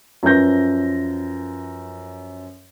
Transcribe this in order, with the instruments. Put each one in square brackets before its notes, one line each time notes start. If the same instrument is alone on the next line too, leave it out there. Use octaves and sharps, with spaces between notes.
[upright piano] F#2 F3 B4 G6 A#6